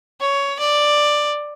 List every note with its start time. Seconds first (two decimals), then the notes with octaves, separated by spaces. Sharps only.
0.21 C#5
0.59 D5